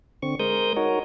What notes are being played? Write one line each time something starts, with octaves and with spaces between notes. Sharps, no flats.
D3 C4 C#6
G#3 A#4 C5 D#6 G6
D#4 F#4 A#4 C#5